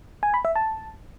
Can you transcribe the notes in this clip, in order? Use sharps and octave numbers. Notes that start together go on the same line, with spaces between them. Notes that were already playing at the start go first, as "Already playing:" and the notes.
G#5
B5
E5
A5